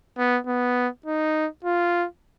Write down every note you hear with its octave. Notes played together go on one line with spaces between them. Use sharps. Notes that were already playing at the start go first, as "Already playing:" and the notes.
B3
B3
D#4
F4